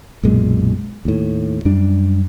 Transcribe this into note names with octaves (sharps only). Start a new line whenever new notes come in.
B1 F#2 A#2 G#3
D#2 A2
F#2 G3 D4